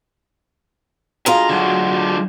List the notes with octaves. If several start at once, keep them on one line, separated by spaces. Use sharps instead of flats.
D2 G#3 F4 A#5
D3 F#3